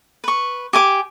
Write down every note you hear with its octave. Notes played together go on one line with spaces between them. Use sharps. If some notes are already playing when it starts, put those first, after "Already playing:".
B4 C#6
G4 G#5 D6